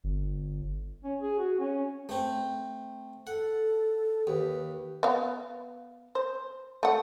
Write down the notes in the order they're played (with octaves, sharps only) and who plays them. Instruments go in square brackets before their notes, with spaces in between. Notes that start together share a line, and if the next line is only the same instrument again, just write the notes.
[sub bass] G1
[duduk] C#4
G#4
F#4
C#4
[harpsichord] A3 C4
[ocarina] A4 [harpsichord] F#5
[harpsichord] D#2 [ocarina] B4
[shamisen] B3 F5
C5
A3 F#5